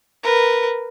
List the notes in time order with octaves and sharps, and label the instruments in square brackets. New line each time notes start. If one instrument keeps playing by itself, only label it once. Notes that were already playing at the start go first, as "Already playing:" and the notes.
[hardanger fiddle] A#4 B4